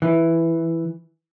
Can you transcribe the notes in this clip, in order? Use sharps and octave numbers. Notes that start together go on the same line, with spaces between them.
E3